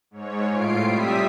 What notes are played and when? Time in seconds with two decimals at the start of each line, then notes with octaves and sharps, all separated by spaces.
0.11 G#2 C#5
0.48 A2 F4 C7 D7
0.84 C3 G3 E5 D#6 B6